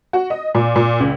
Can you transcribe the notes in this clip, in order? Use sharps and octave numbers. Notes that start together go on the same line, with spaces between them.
F#4
D#5
A#2
A#2
C#2